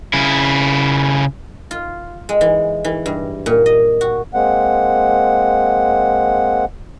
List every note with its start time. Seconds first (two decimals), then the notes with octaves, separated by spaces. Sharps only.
0.13 C#3 E4
1.71 F4
2.29 G#3
2.41 E3
2.84 E3
3.06 G2
3.46 A#2
3.66 D#5
4.01 F#4
4.34 G#3 A#3 C4 F#5